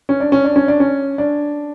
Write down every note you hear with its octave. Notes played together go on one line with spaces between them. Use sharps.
C#4
D4
C#4
D4
C#4
D4
C#4
D4